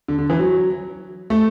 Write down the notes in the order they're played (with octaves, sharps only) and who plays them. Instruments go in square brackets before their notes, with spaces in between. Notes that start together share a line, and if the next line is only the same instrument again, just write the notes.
[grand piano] D3
D3
E3
F#3
A3